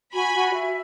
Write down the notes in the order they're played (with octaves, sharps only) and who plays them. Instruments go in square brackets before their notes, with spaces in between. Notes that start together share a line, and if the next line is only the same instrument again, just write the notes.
[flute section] F#4 [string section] G#5 B5
[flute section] F#4
E5